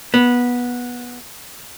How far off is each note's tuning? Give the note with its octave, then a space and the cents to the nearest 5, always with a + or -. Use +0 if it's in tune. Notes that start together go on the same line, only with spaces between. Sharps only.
B3 -15